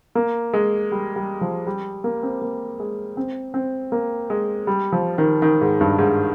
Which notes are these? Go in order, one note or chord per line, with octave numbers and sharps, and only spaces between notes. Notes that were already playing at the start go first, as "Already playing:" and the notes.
A#3
G#3
G3
G3
F3
G3
A#3
C4
A#3
G#3
C4
C4
A#3
G#3
G3
F3
D#3
D#3
G#2
G2
G#2